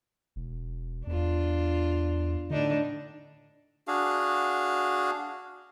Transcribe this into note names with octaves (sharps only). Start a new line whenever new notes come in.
E1
E2 D4 F4
A2 D3 D4 D#4
D4 F#4 G#4 F5